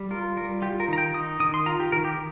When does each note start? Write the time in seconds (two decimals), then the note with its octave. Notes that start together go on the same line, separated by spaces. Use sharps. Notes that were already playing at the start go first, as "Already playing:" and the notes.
Already playing: G3
0.11 F4 A#4
0.37 G3 A#4
0.62 F4 G4
0.80 A#4
0.88 D#3 A#5
0.98 G5
1.14 D#4 D#6
1.40 D#3 D#6
1.54 C6
1.66 F4 A#5
1.80 G4
1.92 D#3 A#4
2.05 G4